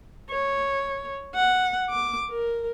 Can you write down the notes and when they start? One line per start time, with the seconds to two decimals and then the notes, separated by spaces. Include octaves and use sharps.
0.30 C#5
1.35 F#5
1.89 D6
2.30 A#4